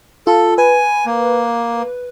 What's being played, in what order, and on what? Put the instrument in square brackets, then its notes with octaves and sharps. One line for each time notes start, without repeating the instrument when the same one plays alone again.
[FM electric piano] F4 [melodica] A4
[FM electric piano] B4 [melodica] G#5
[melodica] A#3